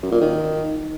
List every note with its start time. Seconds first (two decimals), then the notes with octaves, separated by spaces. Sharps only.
0.02 F#2
0.12 A#2
0.21 D#3